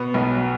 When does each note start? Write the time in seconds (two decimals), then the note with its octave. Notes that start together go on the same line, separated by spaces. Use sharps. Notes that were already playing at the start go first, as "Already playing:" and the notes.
Already playing: B2 B3
0.14 B1